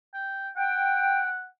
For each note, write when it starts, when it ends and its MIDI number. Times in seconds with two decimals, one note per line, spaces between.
0.14 0.49 79
0.56 1.46 78
0.56 1.28 79